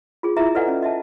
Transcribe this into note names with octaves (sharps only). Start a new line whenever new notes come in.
F4 G#4
E4 F4 G#4 E5 A#5
A4 B4 D5 D#5 F#5 G#5
C#4 D5
D#5 E5 A5